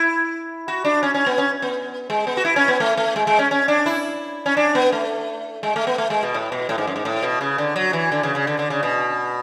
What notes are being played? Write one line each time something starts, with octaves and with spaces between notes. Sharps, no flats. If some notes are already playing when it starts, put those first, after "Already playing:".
Already playing: E4
F#4
D4
C#4
C#4
B3
C#4
B3
G#3
B3
F#4
E4
C#4
B3
A3
A3
G#3
G#3
C#4
C#4
D4
E4
C#4
D4
B3
A3
G#3
A3
B3
A3
G#3
B2
A2
B2
A2
G#2
F#2
G#2
A2
B2
C#3
D3
F#3
E3
D3
C#3
C#3
D3
D3
C#3
B2